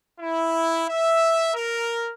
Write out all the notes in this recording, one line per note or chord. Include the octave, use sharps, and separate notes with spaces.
E4
E5
A#4